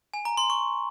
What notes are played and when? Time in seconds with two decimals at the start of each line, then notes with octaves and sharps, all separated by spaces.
0.14 G#5
0.25 A#5
0.37 C6
0.50 C#6